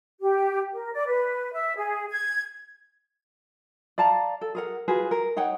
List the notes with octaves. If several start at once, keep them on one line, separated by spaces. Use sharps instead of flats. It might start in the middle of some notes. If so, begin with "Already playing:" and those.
G4
A#4
D5
B4
E5
G#4
G#6
D5 F5 A5 A#5
A4
G#4 A#4 F#5
F4 F#4 G#4 B4
A#4
D#4 C#5 F#5 G5